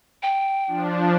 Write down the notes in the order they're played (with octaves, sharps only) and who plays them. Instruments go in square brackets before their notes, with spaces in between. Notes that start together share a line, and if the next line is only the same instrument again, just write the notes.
[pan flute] G5
[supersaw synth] F3 D4